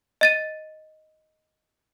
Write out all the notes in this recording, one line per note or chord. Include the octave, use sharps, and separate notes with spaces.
D#5 A6 D#7